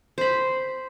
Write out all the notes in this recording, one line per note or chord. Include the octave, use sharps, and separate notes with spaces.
C5 B5